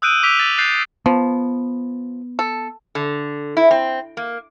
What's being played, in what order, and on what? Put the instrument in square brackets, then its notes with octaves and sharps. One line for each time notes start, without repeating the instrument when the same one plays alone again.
[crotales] D#6 E6 F#6 G6 D7 D#7
D6 E6 B6 D7 F7 G7
A6
F#6 G6 A6 C7
[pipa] F3 [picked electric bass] B3
[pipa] A4
[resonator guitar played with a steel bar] D3
E4
C4
A#3